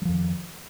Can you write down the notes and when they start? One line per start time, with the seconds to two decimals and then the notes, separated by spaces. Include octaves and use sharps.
0.02 F#3
0.05 F3
0.09 F2
0.12 D#3